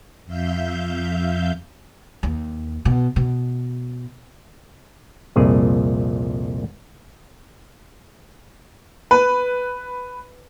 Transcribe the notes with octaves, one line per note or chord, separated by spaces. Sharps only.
F2 E5 F5 G6
D#2
B2
B2
C2 F2 A#2 G#4
B4